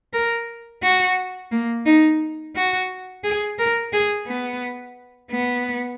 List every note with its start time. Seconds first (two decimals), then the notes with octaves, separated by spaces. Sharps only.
0.13 A#4
0.82 F#4
1.51 A#3
1.86 D#4
2.55 F#4
3.24 G#4
3.59 A#4
3.93 G#4
4.27 B3
5.31 B3